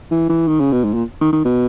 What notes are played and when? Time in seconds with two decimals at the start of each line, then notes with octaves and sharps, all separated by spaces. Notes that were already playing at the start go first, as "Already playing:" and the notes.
0.11 E3
0.29 E3
0.48 D#3
0.60 C#3
0.72 B2
0.84 G#2
0.94 A#2
1.21 D#3
1.33 D#3
1.45 B2